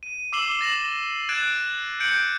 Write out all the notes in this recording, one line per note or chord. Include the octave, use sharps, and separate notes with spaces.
D#7
D6 E6 C7 E7 F#7 G7
A6 A#6 E7 F#7
F#6 G#6 A6 D7 E7
G6 C#7 D7 F#7